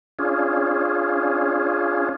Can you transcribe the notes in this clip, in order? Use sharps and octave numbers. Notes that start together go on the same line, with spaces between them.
C#4 D4 F4 G#4